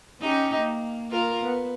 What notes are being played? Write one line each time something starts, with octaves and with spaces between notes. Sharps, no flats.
C#4 D#4 G4
A#3
A#3 F4 A#4
B3